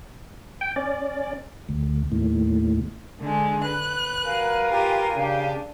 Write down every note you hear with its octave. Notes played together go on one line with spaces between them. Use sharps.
G5
C#4 D5
D2
D#2 A2
D3 G#3
B4 F#6
G3 F#4 A#4 F5 G#5
F4 G4 A#4
C#3 D4 G4